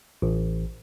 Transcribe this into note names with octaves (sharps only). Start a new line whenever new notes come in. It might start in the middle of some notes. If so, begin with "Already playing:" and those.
A1